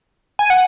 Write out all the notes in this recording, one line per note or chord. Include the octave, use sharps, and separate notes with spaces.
G#5
F#5